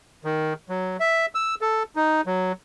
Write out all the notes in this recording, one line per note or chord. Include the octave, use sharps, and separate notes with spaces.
D#3
F#3
E5
E6
A4
D#4
F#3